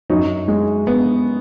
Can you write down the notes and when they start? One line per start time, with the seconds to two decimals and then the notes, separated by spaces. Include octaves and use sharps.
0.10 F#2 F#3 D#4
0.48 G#3
0.87 B3